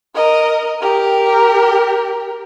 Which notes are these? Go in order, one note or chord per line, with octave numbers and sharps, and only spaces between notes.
A#4 D#5
G4 A#4